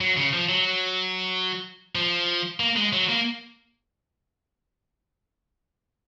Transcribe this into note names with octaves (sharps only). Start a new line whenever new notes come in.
F#3
C#3
F3
F#3
F3
A#3
G#3
F#3
A#3